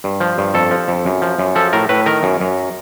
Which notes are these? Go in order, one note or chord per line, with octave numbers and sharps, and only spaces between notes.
G2
F3
G2
F2 A4
F3
F2
F#2
F3
F#2
F3 A4
A2 A#4
A2 B4
D#3 A#4
F#2
F#2